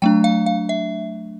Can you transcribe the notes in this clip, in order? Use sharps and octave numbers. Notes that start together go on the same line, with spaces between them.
F#3 A3 D4 G5
F5
F5
E5